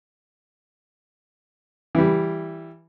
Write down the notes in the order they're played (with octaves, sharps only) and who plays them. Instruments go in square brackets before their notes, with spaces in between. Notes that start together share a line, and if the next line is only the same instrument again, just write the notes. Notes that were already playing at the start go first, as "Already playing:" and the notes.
[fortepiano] E3 G3